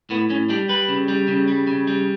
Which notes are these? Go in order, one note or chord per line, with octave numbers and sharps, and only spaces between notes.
A2 B3
A2 C#4
G3 D4
G3 B4
C#3
G3
C#3
G3
C#3
G3